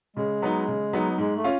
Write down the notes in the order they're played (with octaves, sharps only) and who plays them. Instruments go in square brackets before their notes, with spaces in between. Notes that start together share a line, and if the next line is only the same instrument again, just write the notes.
[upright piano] C#3 [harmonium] G#3
[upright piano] F#3 B3 D#4
C#3
F#3 B3 D#4
[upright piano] G#2 [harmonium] G#3
[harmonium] A3
[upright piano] C#4 F4